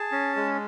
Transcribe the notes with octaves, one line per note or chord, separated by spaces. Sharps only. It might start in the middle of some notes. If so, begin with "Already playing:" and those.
Already playing: G#4 A5
C#4
G#3